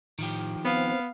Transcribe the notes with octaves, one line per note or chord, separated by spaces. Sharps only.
A2 D#3 F3 G4
B3 C4 C5 F5